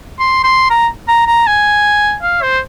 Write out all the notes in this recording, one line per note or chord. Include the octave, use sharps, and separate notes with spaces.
C6
C6
A#5
A#5
A#5
G#5
F5
C5